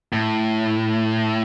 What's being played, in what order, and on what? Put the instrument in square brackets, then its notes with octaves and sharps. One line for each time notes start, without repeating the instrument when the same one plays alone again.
[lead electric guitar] A2